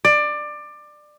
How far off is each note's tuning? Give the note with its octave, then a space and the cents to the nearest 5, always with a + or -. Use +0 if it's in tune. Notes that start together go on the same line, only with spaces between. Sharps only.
D5 +20